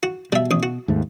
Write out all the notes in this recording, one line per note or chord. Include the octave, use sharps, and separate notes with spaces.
F#4
B2 G3 E5
A1 D#6
F#4
D#2 G#2 A3